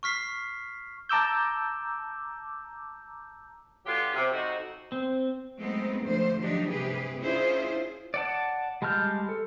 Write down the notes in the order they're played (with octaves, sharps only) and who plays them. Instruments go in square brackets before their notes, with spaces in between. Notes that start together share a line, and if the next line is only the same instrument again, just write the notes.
[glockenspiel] C#6 F6 B6 C7
[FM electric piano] A5 A#5 D6 E6 G6
[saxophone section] D3 F#3 B3 F4 G4
C3
F2 D#4 F#4
[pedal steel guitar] C4
[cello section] F#3 G#3 A3 B3 C4 D#4
D2 G#2 D3 F3 C5
F3 F#3 D4 D#4 G4
G2 C3 G4 G#4 B4
C#4 D4 E4 F4 G#4 C5
[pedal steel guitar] D5 F#5 A5
G3 G#3 A5 F6 G6
A4